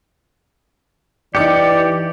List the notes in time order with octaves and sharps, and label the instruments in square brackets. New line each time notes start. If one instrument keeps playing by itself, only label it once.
[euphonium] E3 [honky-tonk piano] D#4 D6 C#7 [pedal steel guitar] G4 [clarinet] D5